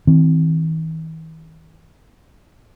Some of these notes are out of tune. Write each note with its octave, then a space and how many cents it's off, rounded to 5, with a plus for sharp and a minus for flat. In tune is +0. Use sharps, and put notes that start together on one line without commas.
E3 -45 C4 +0